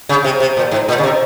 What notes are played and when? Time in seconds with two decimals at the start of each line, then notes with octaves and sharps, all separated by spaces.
0.09 C#3
0.24 C3
0.40 C3
0.57 A#2
0.71 G#2
0.88 A#2
0.98 C#3
1.03 C3